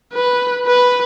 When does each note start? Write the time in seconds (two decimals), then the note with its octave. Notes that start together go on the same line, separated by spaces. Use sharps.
0.14 B4
0.67 B4